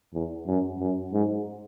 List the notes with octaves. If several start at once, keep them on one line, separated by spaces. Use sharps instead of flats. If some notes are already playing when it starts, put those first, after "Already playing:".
E2
F#2
F#2
G#2